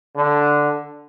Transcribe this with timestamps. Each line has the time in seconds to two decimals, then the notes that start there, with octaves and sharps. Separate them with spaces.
0.16 D3